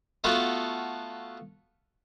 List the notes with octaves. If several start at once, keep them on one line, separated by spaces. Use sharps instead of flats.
A3 B3 F4 F#4 A4